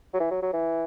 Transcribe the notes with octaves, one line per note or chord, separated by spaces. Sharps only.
F#3
E3
F#3
F#3
E3